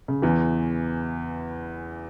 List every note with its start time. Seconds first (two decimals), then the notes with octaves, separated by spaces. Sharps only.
0.08 C#3
0.22 E2 E3